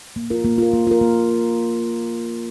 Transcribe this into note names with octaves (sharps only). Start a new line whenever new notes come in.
A#3
F4 A#4
A#3
F4 A#4
A#3
F4 A#4
A#3